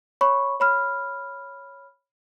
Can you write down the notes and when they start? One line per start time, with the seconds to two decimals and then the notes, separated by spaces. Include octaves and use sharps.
0.21 C#5 B5 C#6
0.60 C#5 B5 F6